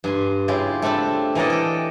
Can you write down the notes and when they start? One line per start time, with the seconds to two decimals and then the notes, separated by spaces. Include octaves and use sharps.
0.04 G2 G#5 C6
0.48 C#3 E4 F4 G4
0.82 A3 C4 D4 A5 B5
1.35 E3 A#3 C#4 A4 D5 D#5
1.50 A4 G5